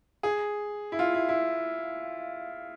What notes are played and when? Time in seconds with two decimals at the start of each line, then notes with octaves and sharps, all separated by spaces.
0.23 G#4
0.92 E4
0.99 F4
1.14 E4
1.29 E4